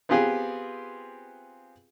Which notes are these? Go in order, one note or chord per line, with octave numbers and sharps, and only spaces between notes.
B3 C4 F4 G4 G#4 B4